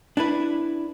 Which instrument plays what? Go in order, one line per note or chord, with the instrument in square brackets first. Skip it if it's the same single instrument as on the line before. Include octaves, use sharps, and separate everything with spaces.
[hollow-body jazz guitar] D4 E4 B4